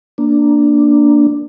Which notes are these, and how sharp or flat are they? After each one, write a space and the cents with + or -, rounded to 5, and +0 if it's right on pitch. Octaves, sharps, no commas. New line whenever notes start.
A#3 +0 D4 +0